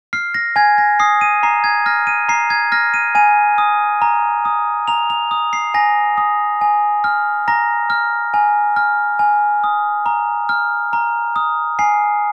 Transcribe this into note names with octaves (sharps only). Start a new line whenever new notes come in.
F6 C7
A#6
G#5 G#6
A#6
D#6 C7
D#7
A#5 C7
G#6
F6 A#6
D#7
A#5 C7
G#6
F6 A#6
D#7
G#5 D#7
D#6
A#5
D#6
A#5 F7
F7
D#6
C7
G#5 A#6
D#6
G#5
F6
A#5 A#6
F6
G#5
F6
G#5
D#6
A#5
F6
A#5
D#6
G#5 C7